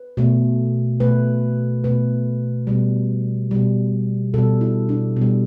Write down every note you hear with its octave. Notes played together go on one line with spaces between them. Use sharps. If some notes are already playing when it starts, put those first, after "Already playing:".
Already playing: B4
B2 A3
B2 A3 B4
B2 A3 B4
B2 G3
B2 G3
B2 G3 A4
E4
D4
B2
G3